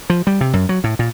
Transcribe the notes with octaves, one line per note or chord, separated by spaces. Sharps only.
F3
G3
C3
F#2
F#3
A2
A#2